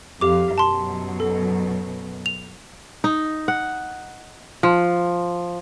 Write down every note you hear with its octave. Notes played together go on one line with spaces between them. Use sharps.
F2 G4 F5 D6
F#2 B2 F#3 A5 C6
A4
F7
D#4
F#5
F3